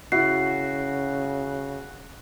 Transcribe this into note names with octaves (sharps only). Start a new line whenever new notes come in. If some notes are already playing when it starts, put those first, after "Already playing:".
C#3 E4 F#4 C7